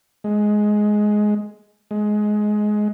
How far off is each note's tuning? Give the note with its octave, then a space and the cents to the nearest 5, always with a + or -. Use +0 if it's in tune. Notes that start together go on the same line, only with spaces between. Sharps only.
G#3 +10
G#3 +15